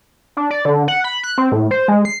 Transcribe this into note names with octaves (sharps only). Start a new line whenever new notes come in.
D4
D5
D3
F#5
B5
F#6
C4
A2
C5
G#3
C7